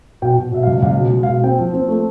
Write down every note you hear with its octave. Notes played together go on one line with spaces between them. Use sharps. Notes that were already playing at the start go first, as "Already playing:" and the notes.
B2 G5
B2
B2 E5
F5
C#2
C#2 F5
B2
G#3
F5
B2
C4 G5
F3
C4
A3